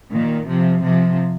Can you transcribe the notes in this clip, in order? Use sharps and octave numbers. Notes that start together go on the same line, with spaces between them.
A#2 D#3
C3 F3
C3 F3